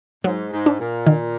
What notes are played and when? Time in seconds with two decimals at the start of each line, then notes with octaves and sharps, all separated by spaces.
0.24 G#2 F#3
0.52 G#2
0.66 D4
0.80 A#2
1.06 D#3